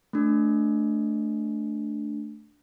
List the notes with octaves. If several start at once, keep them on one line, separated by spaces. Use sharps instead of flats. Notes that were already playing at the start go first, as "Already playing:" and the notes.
A3 D4